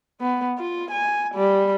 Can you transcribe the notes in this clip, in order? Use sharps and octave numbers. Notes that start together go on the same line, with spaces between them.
B3
F4
G#5
G3